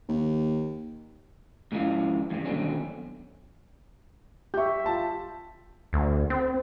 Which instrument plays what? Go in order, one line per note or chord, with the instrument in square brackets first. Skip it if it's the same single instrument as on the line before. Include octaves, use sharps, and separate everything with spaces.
[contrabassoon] D#2
[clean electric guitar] G#2 C#3 F3 E4 F5
E2 G2 C3
D#2 B2 D3 F#3 C4 C#4
[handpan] G4 E5 [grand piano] C#6 G6
[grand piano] F4 A5
[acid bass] D2
C4